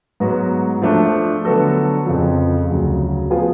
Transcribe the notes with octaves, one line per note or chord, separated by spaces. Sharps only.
G#2 F#3 B3 F#4
F3 A3 D4
D3 F#3 B3 F#4 A4
F2 C#3 F3
D2 C#3 F#3
F3 B3 F4 G#4